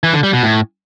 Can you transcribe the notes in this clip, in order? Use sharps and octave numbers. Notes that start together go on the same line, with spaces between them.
E3
D3
G3
B2
A2